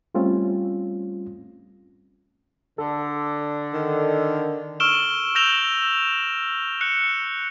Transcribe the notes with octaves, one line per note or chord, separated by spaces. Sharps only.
G3 A3 C4 C#4 F4
D3 A4
D#3
C#6 E6 F6 D7 E7 G7
E6 G6 A#6 E7 F7 G7
F#6 C#7